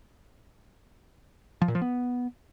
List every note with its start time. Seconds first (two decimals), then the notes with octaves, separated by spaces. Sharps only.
1.62 F3
1.68 A#2
1.75 F3
1.82 B3